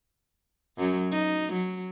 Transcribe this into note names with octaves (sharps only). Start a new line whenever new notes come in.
F#2 F#3
D#4
F#3